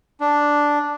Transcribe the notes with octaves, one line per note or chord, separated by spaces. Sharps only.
D4